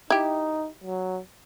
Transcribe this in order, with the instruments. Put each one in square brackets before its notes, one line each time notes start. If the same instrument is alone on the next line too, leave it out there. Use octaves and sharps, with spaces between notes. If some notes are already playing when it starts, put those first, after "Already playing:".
[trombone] D#4 [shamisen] E4 G4
[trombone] F#3